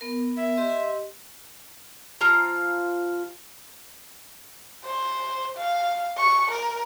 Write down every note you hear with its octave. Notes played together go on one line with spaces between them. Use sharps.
B3 A#4
E5
G4 D#5 C6
F3 F4 A#5
C5
F5
C#6
A#4